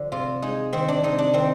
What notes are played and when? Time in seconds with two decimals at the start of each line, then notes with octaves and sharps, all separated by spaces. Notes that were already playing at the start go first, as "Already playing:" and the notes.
Already playing: D3 F3
0.12 C3 F4
0.42 G#3 D#4
0.73 D#3 C4
0.88 D4
1.04 C3 D#4
1.18 D4
1.34 D#3 C4